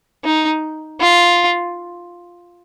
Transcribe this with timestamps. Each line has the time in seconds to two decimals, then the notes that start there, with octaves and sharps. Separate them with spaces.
0.24 D#4
1.00 F4